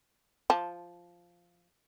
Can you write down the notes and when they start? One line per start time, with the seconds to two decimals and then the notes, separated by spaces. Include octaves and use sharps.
0.50 F3 A5